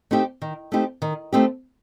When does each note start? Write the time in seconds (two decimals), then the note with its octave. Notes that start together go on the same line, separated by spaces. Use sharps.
0.11 A3 C4 D#4 G4
0.42 D#3
0.72 A3 C4 D#4 G4
1.02 D#3
1.33 A3 C4 D#4 G4